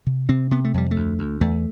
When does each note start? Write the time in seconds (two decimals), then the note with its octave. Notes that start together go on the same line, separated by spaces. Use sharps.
0.07 C3
0.29 C3 C4
0.51 C3 B3
0.65 A3
0.74 F2 G3
0.91 D2 A3
1.19 D2
1.41 E2 A3